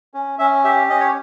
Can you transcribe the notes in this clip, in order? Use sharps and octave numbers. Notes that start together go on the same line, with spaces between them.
C#4
C#4 E5
G4 E5
C#4 D#5
C#5